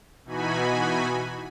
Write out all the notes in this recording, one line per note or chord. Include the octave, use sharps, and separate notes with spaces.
B2 E3 D#4 F#4 G#5 B5